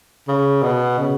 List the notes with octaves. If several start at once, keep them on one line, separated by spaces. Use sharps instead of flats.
C#3
B2
C#3